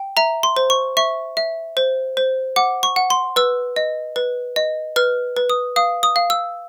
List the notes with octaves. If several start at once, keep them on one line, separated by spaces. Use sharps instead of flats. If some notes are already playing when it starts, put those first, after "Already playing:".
Already playing: G5
E5 A#5
C6
C5
C#6
E5 C#6
E5
C5
C5
F#5 D6
C#6
F#5
C6
B4 E6
D#5
B4
D#5
B4 F6
B4
D#6
F5 D#6
D#6
F5
E6